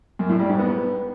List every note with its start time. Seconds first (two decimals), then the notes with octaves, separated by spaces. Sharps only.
0.19 F#2
0.29 A2
0.39 G3
0.49 G#2
0.59 B3